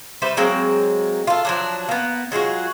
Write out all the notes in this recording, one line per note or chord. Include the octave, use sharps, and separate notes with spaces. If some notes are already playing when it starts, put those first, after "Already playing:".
G3 B4 C5 E5
F#3 G#3 A#3 C4
F4 A4
F3 F#3 D4
A#3 B3
F#3 G#3 F4 F#4